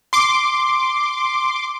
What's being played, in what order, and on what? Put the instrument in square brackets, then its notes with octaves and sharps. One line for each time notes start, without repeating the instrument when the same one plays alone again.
[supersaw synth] C6 D6